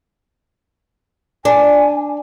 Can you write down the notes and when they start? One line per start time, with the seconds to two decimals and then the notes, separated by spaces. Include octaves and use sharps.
1.45 D4 G#5